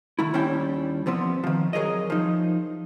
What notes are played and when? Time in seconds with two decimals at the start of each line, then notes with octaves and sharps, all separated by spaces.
0.19 D#3 A3 E4
0.34 D#2 G3 C#4 D4 E4 G5
1.06 E3 F3 B3 C4
1.44 D#3 F3
1.73 F#3 G#4 A#4 D#5
2.10 F3 D#4